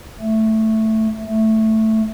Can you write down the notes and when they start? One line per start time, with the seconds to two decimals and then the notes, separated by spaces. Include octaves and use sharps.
0.20 A3
1.26 A3